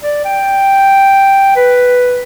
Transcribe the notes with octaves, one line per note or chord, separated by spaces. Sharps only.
D5
G5
B4